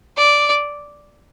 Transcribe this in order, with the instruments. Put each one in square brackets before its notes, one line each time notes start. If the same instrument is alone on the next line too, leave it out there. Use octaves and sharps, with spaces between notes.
[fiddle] D5